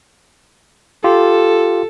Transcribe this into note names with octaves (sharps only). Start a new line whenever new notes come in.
F4 G4 A4